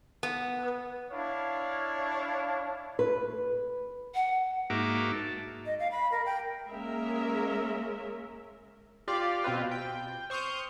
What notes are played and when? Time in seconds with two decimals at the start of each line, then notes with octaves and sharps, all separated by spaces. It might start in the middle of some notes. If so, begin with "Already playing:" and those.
0.23 B3
1.11 D4 E4 C#5 F5
2.99 B4
4.15 F#5
4.70 G#2 A#3 D#4 F#4 E5 D6
5.13 A5
5.66 D#5
5.80 F5
5.91 B5
6.12 A#4
6.26 G5
6.71 G#3 A#3 C#4 A#4 E5
9.08 F4 G4 D5 F5
9.44 B2 C4 F4 B4
9.71 G5
10.30 C5 C#6 D#6 F6 G6